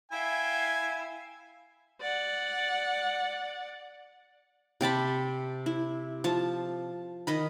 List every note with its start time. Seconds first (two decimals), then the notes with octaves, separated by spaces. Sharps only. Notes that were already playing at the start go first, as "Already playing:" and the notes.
0.12 E4 E5 F5 G5 G#5
2.01 D5 F#5
4.81 C3 G5 A5 B5
5.66 E4
6.24 F3 A5
7.27 D#3 D#5 B5